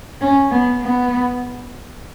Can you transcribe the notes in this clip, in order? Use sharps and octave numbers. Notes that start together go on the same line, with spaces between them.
C#4
B3
B3